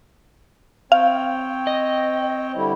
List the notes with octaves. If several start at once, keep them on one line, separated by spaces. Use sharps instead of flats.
C4 C#5 F5 G5
D#5
D3 G3 E4